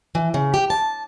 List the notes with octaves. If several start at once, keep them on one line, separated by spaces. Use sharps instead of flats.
E3
C#3
G4
A5